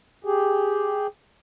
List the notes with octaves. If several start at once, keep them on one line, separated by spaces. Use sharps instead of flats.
G4 G#4